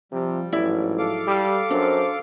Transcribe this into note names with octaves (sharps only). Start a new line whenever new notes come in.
C3 F3 G3
A1 G#2 F3 F#3 E4 D5
A4 F5 D6
G3
F#2 D4 C5